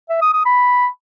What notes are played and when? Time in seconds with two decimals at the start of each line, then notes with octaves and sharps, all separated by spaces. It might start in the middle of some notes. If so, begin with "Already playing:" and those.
0.10 E5
0.21 D#6
0.33 D#6
0.45 B5